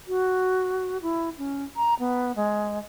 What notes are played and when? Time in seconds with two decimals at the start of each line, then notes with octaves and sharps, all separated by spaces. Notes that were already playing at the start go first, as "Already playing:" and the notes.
0.08 F#4
1.02 E4
1.38 C#4
1.76 A#5
1.99 B3
2.36 G#3